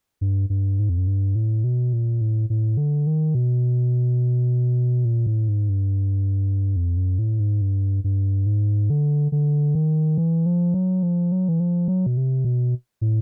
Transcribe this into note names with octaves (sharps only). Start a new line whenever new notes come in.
G2
G2
G#2
F2
F#2
G2
A2
B2
A#2
A2
A2
D3
D#3
B2
A#2
A2
G#2
G2
F2
F#2
A2
G#2
G2
G2
G#2
D3
D3
D#3
E3
F3
F#3
F3
F#3
E3
F3
F#3
B2
C3
B2
A2